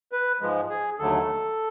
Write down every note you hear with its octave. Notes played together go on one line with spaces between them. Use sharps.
B4
G#2 F3 G#3
G#4
D#2 D3 F#3 A3 A4